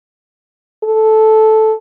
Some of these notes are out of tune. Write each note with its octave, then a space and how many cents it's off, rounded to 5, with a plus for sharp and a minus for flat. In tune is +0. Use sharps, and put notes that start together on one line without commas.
A4 -10